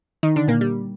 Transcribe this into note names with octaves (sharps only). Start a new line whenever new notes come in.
D#3 D#4
D3 D4
A#2 A#3
G3